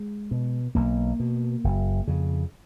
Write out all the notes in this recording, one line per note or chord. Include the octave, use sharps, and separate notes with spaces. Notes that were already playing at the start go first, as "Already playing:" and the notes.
Already playing: G#3
B2
B1 A#3
B2
F#1
F2 C#3